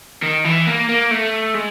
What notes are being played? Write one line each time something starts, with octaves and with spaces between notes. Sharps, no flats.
D#3
E3
A#3
A#3
A3
G#3